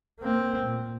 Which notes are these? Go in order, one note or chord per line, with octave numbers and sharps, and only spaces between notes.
A#3 C4
A#2